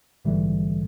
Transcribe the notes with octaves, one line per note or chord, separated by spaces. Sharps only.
A#1 G#2 D3 E3 G3 A3